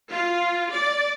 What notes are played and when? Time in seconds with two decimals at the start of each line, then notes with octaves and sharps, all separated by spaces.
0.11 F4
0.71 D5